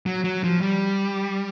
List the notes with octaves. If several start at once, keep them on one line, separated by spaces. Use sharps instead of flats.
F#3
F#3
F3
G3